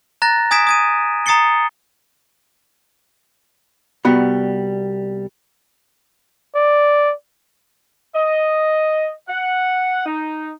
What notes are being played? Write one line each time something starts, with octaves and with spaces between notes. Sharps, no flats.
A#5 F#6 A6 A#6
G#5 D#6 G#6 B6 D7 E7
D#6 G#6 D#7
A#5 D#6 A6 C7 C#7 G7
C2 G3 B3 F#4 B5
D5
D#5
F#5
D#4